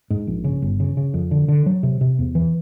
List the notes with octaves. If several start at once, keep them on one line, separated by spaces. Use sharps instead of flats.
G#2
A#1
C#3
G1
C#3
C#3
F2
D3
D3
F#3
C3
C3
E2
E3